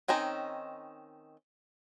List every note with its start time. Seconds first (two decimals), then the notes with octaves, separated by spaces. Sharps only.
0.08 D#3 C4 C#4 D#4